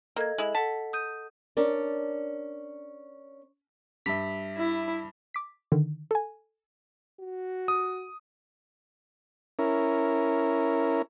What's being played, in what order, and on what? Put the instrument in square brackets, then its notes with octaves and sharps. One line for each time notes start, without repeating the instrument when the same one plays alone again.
[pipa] A#3 [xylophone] A4 D#5 G#6
[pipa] G#3 E4 [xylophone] F#7
[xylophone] A4 F#5 B6 [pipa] A5
[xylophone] D#6 G6 D#7
[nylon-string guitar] C#4 D4 A#4 D5
[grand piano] G2 [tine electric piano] E5 B6
[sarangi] E4
[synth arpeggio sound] D6 B6
D3 D#3
A4 G#5
[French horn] F#4
[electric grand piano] D#6
[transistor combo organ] C#4 E4 A#4